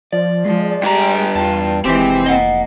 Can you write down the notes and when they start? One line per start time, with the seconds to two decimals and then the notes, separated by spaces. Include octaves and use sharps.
0.13 F3 D5
0.45 F3 G#3
0.84 G2 G4 A#5
1.35 E2 F4 A5
1.85 F1 E3 G#3 C4 G4
2.26 A#3 D#5 F#5